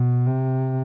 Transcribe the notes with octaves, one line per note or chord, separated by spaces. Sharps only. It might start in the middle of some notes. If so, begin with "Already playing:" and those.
Already playing: B2
C3